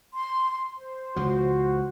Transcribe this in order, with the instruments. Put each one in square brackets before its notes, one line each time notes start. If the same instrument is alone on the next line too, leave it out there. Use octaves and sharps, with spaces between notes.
[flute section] C6
C5
[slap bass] C#2 F3 [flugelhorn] F#4